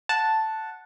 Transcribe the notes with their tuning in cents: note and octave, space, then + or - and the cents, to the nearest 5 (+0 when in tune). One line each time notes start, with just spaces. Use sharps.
F#5 -5 A5 +0